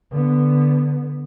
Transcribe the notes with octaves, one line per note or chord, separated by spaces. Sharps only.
D3 B3